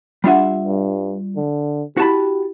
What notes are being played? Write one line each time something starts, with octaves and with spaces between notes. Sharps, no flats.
G3 D4 F4 E5 F#5
G2
D3
E4 F#4 G4 A5 B5